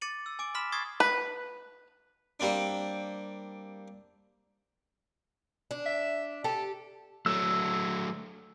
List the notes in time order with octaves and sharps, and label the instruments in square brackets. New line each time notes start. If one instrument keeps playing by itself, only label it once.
[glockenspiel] D6 A6 C#7 D#7 F#7
E6
G#5 D6 D7
B5 C6 F6 B6 E7
C#6 D#6 G#6 A6 C7
[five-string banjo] B4
[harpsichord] G3 A#3 C4 D4
[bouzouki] D4
[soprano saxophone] E5
[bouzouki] G4 [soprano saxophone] A4
[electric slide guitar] F#3 A3 [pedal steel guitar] E6